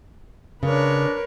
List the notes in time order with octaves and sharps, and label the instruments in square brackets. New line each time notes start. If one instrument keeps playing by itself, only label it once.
[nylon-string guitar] C#3 [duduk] D4 [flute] A#4 [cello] B4 C#5